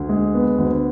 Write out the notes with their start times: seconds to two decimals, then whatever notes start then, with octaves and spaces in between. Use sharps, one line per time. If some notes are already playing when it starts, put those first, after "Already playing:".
Already playing: D2
0.09 G#3
0.34 B3
0.58 D2